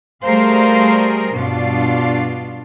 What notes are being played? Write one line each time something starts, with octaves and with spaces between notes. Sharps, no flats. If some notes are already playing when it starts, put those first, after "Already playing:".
G3 A3 G#4 A#4 C5 F5
G2 B2 D4 F4